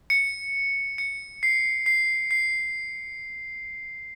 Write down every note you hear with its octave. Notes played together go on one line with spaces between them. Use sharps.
C#7
C#7
C7
C7
C7